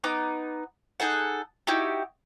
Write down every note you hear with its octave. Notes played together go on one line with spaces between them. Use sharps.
B3 D#4 D6
D#4 G#4 A4 F#5
D#4 E4 F#4 G4